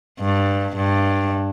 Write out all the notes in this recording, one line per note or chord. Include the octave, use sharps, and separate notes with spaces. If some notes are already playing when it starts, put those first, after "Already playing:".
G2
G2